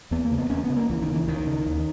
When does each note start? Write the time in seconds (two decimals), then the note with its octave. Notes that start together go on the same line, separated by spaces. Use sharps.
0.11 E2 B3
0.25 A#3
0.31 C#3
0.38 B3
0.50 E2 C#4
0.64 B3
0.70 C#3
0.76 A#3
0.90 C#2 E3
1.02 D#3
1.08 C#3
1.15 E3
1.27 C#2 D#3
1.47 C#3
1.66 D#2